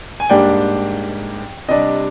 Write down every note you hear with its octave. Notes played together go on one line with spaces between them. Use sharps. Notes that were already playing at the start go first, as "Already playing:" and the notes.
G#5
G#2 G3 A#3 D4 G5
C3 G3 D4 D#5